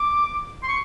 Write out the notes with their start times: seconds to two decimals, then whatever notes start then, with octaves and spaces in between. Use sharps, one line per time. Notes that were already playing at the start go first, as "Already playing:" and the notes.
Already playing: D6
0.63 C6
0.68 C#6